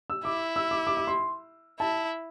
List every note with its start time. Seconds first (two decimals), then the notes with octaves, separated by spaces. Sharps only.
0.10 E6
0.25 E4 D6
0.56 E6
0.71 D6
0.87 D6
0.97 D6
1.07 C6
1.80 E4 A5